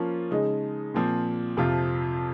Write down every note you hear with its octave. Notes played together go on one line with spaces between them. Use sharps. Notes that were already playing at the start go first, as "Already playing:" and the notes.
Already playing: F3 A#3 C#4 F4
C#3 G#3 D#4
A#2 F3 C4
F2 C3 F3 C4 F4